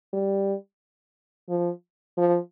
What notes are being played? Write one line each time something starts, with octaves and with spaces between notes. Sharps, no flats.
G3
F3
F3